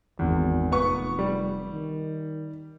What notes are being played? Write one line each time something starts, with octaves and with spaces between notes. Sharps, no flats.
G#1 E2
F1 B3 C#6
G3
D#3